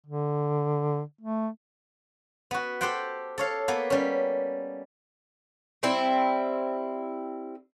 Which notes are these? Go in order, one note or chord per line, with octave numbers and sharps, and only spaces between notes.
D3
A3
B3 F#4
G4 A4 C5 F#5 G5
A4 C#5 F5
A#3 B3
G3 C#4
G3 C4 E4